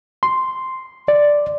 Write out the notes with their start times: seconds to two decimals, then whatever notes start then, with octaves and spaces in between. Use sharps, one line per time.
0.23 C6
1.08 D5